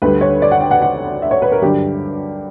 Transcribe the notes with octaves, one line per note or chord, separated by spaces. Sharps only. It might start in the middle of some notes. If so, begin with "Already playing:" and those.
D2 D3 G3 B4
C#5
D5
F#5
G5
F#5
F#5
E5
C#5
B4
A#4
G2 D3 F#3 G4